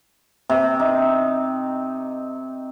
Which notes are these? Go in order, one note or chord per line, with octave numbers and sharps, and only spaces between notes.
C3
D#4